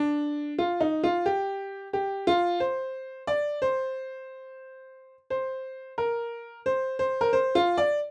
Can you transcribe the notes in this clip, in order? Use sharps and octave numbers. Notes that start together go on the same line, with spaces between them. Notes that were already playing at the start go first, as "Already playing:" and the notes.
Already playing: D4
F4
D#4
F4
G4
G4
F4
C5
D5
C5
C5
A#4
C5
C5
A#4
C5
F4
D5